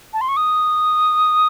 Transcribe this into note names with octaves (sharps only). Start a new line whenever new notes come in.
A5
C6
C#6
D#6